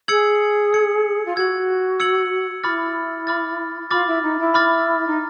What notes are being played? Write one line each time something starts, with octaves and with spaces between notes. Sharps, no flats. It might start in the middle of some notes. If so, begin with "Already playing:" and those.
G#4 E6 G#6 C#7 F#7
E6 G#6 C#7 F#7
F4
F#4 E6 G#6 C#7 F#7
E6 G#6 C#7 F#7
E4 F4 B5 D6 F6 A6
B5 D6 F6 A6
F4 B5 D6 F6 A6
E4
D#4
E4
B5 D6 F6 A6
D#4